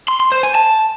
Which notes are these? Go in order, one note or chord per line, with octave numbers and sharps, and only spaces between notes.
C6
C6
C5
G#5
A5